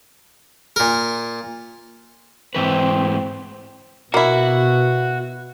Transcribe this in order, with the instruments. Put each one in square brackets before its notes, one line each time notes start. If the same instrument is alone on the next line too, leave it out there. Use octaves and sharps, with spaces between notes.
[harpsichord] A#2 A#4
[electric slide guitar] G#2 E3 B4 [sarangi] C4
[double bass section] B2 [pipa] A#3 E4 [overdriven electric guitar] F#4